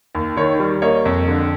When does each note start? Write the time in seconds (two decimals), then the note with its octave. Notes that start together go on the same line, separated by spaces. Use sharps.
0.15 D#2
0.37 D#3 C#5
0.60 G3
0.82 A#3 C#5 D#5
1.05 F2
1.28 D3